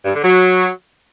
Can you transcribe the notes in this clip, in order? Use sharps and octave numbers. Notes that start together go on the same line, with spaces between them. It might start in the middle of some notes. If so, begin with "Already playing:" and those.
G2
D3
F#3